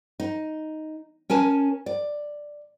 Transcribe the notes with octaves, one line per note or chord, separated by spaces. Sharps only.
D#4
C#4 A#4 G#5 A5
D5